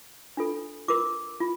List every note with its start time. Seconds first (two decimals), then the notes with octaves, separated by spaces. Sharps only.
0.37 D4 F4 A4
0.88 F4 A#4 D6
1.40 F4